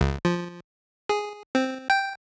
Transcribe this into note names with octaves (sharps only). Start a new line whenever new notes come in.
C#2
F3
G#4
C4
G5